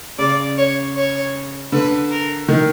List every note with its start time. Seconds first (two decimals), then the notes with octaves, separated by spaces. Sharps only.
0.18 C#3 D5
0.58 C#5
0.96 C#5
1.72 D3 B4
2.11 A#4
2.48 D#3